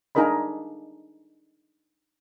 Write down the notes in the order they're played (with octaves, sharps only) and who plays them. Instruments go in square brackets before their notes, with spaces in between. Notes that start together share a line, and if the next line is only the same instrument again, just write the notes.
[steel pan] D4 D#4 G#4 A#4 D#5 B5